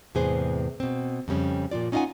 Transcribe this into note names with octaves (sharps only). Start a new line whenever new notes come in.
E2 A2 C3 G#4 B4 C5
B2 C4
F2 C#3 G3 C#4
A#2 F3 F4 D5
C#4 D#4 F4 D#5 F#5 G#5